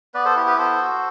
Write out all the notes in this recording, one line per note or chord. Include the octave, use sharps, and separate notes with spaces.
B3 B4 D5
A4 C5
E4 G4
G4 B4
B3 A4 C5
F#4